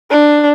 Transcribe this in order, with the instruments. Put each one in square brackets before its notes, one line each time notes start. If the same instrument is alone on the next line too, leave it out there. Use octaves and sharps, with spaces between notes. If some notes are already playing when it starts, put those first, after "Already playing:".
[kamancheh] D4